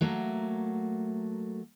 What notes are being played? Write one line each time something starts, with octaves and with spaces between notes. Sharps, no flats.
F#3 A3 A#3